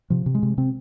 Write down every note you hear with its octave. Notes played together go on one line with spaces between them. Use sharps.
C3 F3
C3
G#3
C3
C3 C4